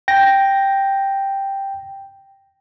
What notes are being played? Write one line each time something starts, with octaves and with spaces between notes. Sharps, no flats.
G5 A#6